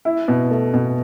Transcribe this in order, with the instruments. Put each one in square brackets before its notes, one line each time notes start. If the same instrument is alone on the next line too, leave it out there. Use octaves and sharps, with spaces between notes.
[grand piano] E4
B2
A3
B2